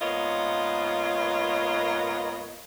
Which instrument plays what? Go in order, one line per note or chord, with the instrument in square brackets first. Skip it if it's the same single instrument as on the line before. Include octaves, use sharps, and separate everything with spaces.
[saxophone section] G#2 A#3 B3 F4 C#5 D#5